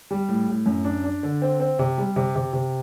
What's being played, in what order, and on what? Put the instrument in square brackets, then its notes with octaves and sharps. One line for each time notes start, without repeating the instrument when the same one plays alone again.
[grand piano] G3
A2
A2
F#2
D4
D4
D3
C4
C4
C3
G3
C3
C3
C3